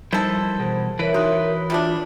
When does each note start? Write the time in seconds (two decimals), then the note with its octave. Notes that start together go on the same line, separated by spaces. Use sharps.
0.12 D#3 F3 G3 E4 A4 C5
0.60 B2 E3 G#4 C5
0.99 E3 E4 A#4 B4 C#5 E5
1.14 D#4 F#4 C6 F#6
1.70 G3 A3 D4 F4